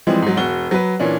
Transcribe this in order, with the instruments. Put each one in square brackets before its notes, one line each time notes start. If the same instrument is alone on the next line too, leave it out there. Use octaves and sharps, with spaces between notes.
[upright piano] E3 F3 G3 G#3 C4
G#2 F#3
E1 F#4 G7
F#3 B4
A#2 E3 C#4 D4